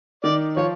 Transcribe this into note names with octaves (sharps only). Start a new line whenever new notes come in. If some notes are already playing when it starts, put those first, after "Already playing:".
D#3 D#4 D5
F3 F4 C#5